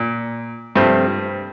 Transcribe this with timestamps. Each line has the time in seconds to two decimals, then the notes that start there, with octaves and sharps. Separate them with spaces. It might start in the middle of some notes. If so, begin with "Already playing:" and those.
Already playing: A#2
0.75 G2 C3 F3 A3 C4